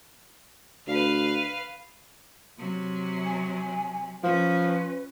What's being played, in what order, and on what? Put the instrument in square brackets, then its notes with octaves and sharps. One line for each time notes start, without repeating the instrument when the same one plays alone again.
[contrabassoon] D2 [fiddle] B4 F5
[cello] C3 F#3
[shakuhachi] G#5
[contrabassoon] F3 [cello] C#4 [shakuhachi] B4